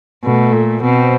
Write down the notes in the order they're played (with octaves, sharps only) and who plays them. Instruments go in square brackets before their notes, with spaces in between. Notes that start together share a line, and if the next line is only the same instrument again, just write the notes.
[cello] B2 [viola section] A3
[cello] A#2
[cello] B2 [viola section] C4